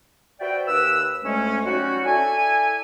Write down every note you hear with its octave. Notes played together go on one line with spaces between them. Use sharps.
F#4 B4 C5 D5 E5 G5
D#2 B4 E6
D2 G#3 A3 C#4
F#3 G3 C#4 D#4 F#4
E4 A4 D5 E5 G#5